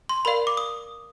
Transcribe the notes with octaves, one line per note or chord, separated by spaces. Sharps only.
C6
A#4 D5 F5 B5
D6
D#6